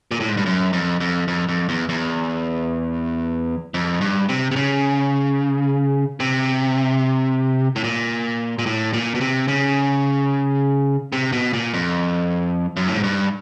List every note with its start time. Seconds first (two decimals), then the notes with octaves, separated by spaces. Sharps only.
0.11 A#2
0.20 A2
0.28 G#2
0.37 G2
0.46 F#2
0.73 F2
1.00 F2
1.28 F2
1.48 F2
1.69 E2
1.89 E2
3.74 F2
4.01 G2
4.29 C3
4.51 C3
4.56 C#3
6.20 C3
7.76 A2
7.84 A#2
8.59 A#2
8.66 A2
8.93 A#2
9.15 B2
9.21 C3
9.48 C#3
11.13 C3
11.32 B2
11.53 A#2
11.74 F2
12.77 F#2
12.88 A2
12.96 G#2
13.03 G2